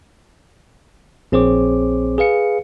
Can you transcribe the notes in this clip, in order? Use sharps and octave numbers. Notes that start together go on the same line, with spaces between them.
A#1 C4 G#4 C5 C#5 D6
G#4 B4 F5 C#7